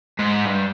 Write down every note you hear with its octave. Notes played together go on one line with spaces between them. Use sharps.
G#2
G2